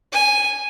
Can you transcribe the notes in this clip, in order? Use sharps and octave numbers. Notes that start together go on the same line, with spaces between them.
G#5